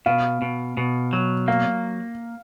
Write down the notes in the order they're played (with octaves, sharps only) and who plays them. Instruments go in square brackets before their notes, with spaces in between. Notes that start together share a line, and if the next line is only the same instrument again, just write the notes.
[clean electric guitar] B2 [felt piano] F5
[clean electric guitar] B2
B2
F#3
[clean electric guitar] A#3 [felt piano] F5